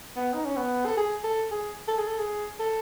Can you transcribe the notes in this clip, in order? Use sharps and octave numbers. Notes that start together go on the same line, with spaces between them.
B3
D#4
C#4
B3
A4
G#4
A4
G#4
A4
G#4
A4
G#4
A4